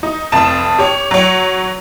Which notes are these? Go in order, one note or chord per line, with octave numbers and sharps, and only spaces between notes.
D#4
F1 F2 A5 E7
G4 C#5
F#3 C#5